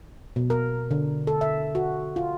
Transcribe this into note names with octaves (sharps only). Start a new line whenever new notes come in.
B2
A#4
D3
A4
E5
F#4
F4